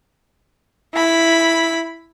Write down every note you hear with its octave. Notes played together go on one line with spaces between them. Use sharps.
E4 B5